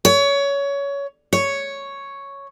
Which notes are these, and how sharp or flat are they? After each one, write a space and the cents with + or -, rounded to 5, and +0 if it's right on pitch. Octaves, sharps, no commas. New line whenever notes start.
C#5 +20
C#5 +0